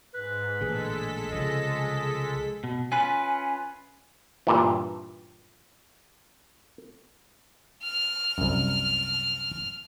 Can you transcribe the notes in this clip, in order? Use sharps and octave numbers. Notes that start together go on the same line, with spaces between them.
G#2 B4
A1 A#2 D3 G#3 G#4 A4 B6
C2 C#3 F3 D#5
B2
C#4 F4 B4 G#5
G2 A#2 E3
F6
C2 F#2